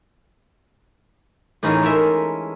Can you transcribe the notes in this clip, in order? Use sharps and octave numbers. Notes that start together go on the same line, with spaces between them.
A2 E3 C#4 D#4 F4 G#4
G#3 A4 A#4 E5